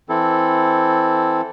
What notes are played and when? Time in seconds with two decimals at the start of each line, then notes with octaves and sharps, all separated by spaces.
0.09 E3 C4 E4 A4